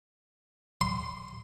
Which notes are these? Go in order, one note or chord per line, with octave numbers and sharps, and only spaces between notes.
C6